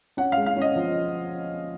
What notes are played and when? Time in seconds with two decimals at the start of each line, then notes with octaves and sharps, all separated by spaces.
0.17 C#4 F#5
0.32 F5
0.37 G#3
0.46 F5
0.56 C#4
0.61 D#5
0.76 F3